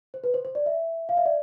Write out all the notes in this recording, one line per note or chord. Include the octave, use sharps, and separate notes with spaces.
C5
B4
C5
C5
D5
E5
F5
E5
D5